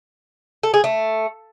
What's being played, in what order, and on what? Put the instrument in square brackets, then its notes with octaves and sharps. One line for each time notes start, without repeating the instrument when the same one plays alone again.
[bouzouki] A4
G#4
A3